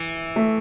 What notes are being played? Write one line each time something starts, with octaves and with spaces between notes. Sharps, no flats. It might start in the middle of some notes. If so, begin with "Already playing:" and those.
Already playing: E3
A3